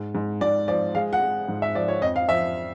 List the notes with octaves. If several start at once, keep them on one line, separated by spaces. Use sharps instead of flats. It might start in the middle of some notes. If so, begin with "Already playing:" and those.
Already playing: G#2
G#2
G#2 D5
F3 D5
G#3 F5
F#5
G#3
G#2
E5
F3 D5
C#5
F2 D#5
F5
F3 E5